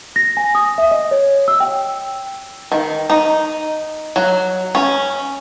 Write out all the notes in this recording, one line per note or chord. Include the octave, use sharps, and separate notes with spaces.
A#6
G#5
D#6
E5
D#5
C#5
E6
G5
D#3
D#4
F#3
C#4